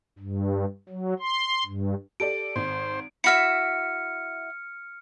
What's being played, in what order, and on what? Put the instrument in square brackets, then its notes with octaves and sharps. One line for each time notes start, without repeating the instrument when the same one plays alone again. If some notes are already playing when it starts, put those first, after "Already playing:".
[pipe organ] G2
F#3
C6
G2
[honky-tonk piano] G4 A4 D5 [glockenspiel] D7
[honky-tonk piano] G#1 [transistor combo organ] C5
[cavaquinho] E4 F#4 E5 [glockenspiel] F6 C#7